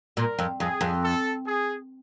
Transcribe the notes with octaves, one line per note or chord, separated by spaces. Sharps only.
A#2 A#4
F2
F2 G#4
F2
A4
G#4